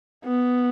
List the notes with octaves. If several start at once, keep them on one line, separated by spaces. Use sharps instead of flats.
B3